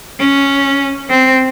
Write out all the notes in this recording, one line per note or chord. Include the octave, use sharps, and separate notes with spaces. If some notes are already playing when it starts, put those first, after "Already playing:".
C#4
C4